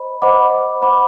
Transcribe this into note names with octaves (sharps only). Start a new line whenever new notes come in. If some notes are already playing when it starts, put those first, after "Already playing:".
Already playing: C5 D#5 B5
C5 D#5 F#5 B5 D6
C5 D#5 F#5 B5 D6